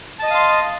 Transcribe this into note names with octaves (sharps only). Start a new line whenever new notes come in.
D#5 F5 A5 C6 D#6